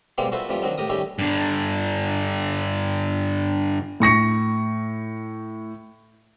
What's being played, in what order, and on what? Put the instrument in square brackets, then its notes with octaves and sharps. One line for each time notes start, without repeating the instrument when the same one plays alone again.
[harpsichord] B2 G3 G#3 A#3 C4 G4
A#2 F#4 A4 B4 C5 E5
F2 E3 G3 A3 F4
D#3 F#3 C4 D4 D#4
A2 G4 A#4 D#6
D#3 G3 A3 C#4 G4 A4
[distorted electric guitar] G2 D3
[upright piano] A2 C#6 A#6 C#7